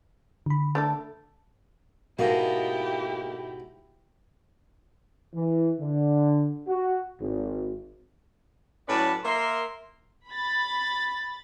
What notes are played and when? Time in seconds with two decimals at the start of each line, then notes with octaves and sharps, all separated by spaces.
0.46 D3 B5
0.75 A3 D4 A4
2.19 G#2 B2 A#3 E4 G4 A4 D#5
5.34 E3
5.79 D3
6.67 F#4
7.20 G#1
8.88 A2 F#3 C#4 B4 D5 A5
9.24 A#3 A#4 E5 C6
10.29 B5 A6